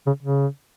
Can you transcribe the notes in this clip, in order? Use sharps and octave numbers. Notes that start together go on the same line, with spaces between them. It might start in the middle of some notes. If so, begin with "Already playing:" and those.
C#3
C#3